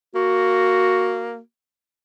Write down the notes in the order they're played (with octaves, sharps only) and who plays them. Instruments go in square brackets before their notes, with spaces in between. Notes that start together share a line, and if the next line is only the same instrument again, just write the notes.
[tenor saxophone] A#3 [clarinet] F#4